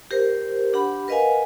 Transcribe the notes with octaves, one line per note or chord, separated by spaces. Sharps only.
G4 A#4 C5
D4 G4 F#5 B5
A#4 B4 D#5 F5 F#5 G#5